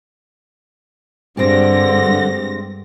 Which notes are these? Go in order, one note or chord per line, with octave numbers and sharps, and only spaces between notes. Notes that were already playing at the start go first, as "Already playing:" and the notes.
G2 D3 G#3 C4 G4 A#6